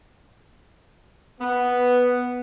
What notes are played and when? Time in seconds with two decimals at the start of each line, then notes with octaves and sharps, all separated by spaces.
1.41 B3